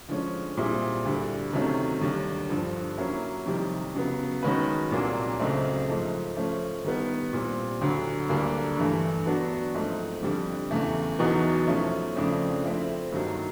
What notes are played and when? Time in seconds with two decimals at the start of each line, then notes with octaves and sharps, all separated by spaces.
0.09 D3 F3 G#3 C#4
0.57 A#2 G3 C4 E4 G#4
1.05 D2 D3 G3
1.53 C3 D#3 F#3 A3 C#4
2.01 D#2 D3 G3
2.49 G2 D3 F3
2.98 F#3 A#3 C#4 E4
3.46 F2 C3 D#3 G3
3.95 C#3 F#3 B3
4.43 D#3 G#3 C#4 F#4 B4
4.91 C2 A#2 F#3 A#3 D4
5.39 C#2 C#3 F#3 A3 C4
5.88 G#2 F3 A3
6.36 F3 A3 C#4
6.84 D#3 G3 B3
7.33 A#2 G3 C4
7.81 D2 D3 F#3
8.29 D2 D3 G3 A#3 D4
8.77 G2 E3 A3
9.26 F#3 B3 D4 F#4
9.74 G#2 F3 A3 C4
10.22 F2 D3 G3
10.71 E2 C#3 E3 A3
11.19 E2 B2 F#3 B3 D#4
11.67 F3 A3 C#4 E4
12.16 F2 C#3 F3 A3 D4
12.64 F3 A3 C4 E4
13.12 G2 D#3 F#3 A#3